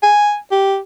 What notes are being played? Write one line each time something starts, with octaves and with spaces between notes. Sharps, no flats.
G#5
G4